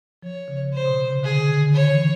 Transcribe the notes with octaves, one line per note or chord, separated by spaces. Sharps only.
F3 C#5
C#3
C3 C5
B2
C3
C#3
D3 G#4
D#3
D3
D3
D#3 C#5
E3